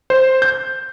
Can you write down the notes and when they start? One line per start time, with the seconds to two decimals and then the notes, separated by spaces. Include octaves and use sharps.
0.10 C5
0.42 G6